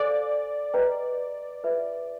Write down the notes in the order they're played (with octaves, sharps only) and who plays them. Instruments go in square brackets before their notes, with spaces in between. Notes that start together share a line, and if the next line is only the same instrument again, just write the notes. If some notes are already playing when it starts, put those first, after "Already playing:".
Already playing: [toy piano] A4 C5 F5 G#5 [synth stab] D5
[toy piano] G#4 B4 D#5 G5 A#5
F4 G#4 B4 E5